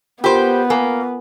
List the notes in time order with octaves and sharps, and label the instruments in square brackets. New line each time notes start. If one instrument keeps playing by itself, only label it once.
[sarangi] B3 [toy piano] F4 A#4 [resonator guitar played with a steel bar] G4 C5
[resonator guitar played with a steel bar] A#3 [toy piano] A#4 B4 G#5